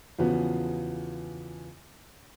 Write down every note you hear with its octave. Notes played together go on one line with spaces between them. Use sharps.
E2 C#3 F3 B3 F#4